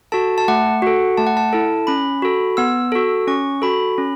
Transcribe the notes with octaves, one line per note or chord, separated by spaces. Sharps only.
F#4 A4 A5
A5
A3 F#5
F#4 A4
A3 A5
F#5
A5
E4 A4
C#4 B5
F#4 A4
B3 E6
F#4 A4
C#4 C#6
F#4 A4 B5
C#4